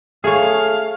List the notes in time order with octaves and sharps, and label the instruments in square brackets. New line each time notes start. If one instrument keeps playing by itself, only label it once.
[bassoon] A3 [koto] G#4 C#5 [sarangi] F5